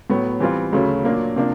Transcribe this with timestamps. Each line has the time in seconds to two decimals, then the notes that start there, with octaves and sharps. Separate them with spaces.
0.10 A2 F#3 B3
0.40 E3 G3 C4 F4
0.73 D2 C#3 F#3 A3
1.04 A#2 F#3 A#3 D4
1.36 C3 F3 A#3 D4